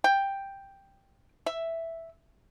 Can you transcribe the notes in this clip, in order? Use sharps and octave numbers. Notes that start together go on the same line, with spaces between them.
G5
E5